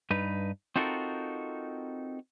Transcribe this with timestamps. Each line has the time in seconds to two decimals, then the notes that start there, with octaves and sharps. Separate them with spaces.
0.10 G2 D#4 B4
0.76 C4 D#4 F4 F#4 A4 A#4